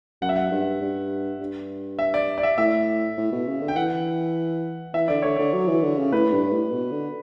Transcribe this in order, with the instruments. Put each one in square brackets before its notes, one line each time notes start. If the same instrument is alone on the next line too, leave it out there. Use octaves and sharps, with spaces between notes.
[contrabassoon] F#2 [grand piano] F#5
[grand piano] E5
F#5
[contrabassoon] G2
G2
G2
[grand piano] E5
D5
D5
E5
[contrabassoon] A2 [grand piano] E5
[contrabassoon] A2
B2
C#3
D3
[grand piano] G5
[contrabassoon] E3 [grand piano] F#5
[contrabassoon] E3 [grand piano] E5
[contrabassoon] D3 [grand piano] D5
[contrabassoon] D3 [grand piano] C#5
[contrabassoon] D3 [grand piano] D5
[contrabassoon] F#3
E3
D3
C#3
[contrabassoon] A2 [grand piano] B4
[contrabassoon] G2
A2
B2
D3